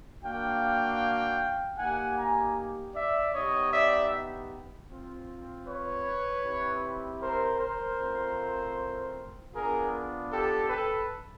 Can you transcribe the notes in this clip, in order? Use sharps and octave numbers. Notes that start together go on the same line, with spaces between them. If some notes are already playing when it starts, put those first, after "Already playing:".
A#3 D4 F#4 F5 G5
A#3 D#4 G4 F#5 G#5
G#5 A#5
D5 E5
B3 D#4 G4 C#5 D#5
D5 E5
C4 F4
B4 C#5
C4 E4 G4
A#4 C5
A#4 C5
A3 C4 F4
B3 D4 F4 G#4 A#4
G4 A4
A4 B4